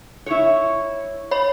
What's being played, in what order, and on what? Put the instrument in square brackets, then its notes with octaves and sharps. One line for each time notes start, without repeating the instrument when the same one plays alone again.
[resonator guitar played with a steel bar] E4 C#5
[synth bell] C#5 B5